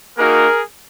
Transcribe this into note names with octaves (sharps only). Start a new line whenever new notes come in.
A#3 D#4 F#4 G#4 A#4